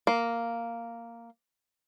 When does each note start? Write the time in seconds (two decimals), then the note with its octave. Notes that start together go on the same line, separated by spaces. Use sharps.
0.07 A#3